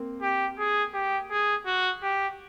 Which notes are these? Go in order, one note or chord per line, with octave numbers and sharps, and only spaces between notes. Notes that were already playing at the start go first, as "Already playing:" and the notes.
Already playing: A#3 C4
G4
G#4
G4
G#4
F#4
G4